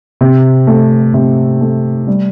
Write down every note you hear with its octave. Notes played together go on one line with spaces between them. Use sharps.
C3
A3
C3
A3
G3